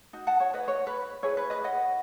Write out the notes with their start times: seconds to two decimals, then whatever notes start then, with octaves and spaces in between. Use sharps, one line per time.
0.13 D#4 F#4
0.27 F#5 A5
0.40 C#5
0.54 B4 D#5
0.68 C#5
0.87 B4
1.23 E4 G#4 B4 C#5
1.37 B4
1.50 B4 D#5
1.64 D#5 F#5